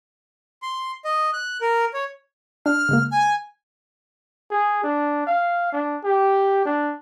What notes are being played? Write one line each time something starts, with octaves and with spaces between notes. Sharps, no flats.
C6
D#5
F#6
A#4
C#5
D4 F6
C#3 G#3 A#3
G#5
G#4
D4
F5
D4
G4
D4